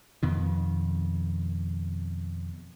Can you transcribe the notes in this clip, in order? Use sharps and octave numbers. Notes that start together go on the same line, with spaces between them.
F2 B2 D#3